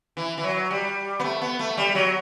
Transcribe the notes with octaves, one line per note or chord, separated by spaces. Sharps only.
E3
E3
F#3
G3
B3
A3
B3
A3
G3
F#3